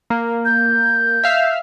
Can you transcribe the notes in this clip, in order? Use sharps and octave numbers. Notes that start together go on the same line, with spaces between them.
A#3
G6
E5 F5